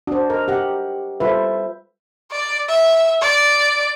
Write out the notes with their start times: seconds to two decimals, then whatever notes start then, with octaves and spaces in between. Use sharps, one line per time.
0.07 D4 F#4 C5
0.30 A#4 D#5
0.48 G4 F#5
1.20 G3 F4 A4 B4 C5 E5
2.31 D5
2.69 E5
3.22 D5